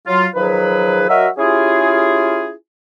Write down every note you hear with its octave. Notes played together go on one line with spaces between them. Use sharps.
F#3 F4
D#3 F3 F#3 G#4 B4
F#3 F#4 A#4 D#5 E5
C#4 E4 F4 G4 G#4